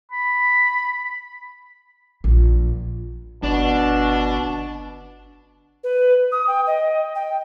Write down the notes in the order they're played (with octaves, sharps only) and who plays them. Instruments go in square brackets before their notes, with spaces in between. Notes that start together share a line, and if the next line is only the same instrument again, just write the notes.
[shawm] B5
[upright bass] A#1
[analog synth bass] G1 [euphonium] B2 [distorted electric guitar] D4
[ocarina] B4
D#6
G5
D#5
G5